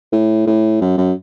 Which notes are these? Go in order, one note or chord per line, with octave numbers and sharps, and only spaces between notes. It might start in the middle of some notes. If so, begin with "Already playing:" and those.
A2
A2
F#2
F#2